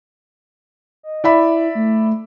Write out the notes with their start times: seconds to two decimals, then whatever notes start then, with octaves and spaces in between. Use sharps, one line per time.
1.03 D#5
1.24 E4 D5 E5 B5
1.75 A3